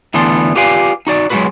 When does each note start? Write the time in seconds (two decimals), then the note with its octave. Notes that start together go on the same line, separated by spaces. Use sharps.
0.14 D2 E3 B3 D4 A4 C6
0.56 F4 G4 B4 D5 F5 G#5
1.07 D#4 F#4 D5
1.30 F#3 G#3 A#3 B3 F#4 B4